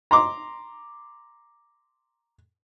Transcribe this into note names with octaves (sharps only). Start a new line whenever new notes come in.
A#5 C6 D6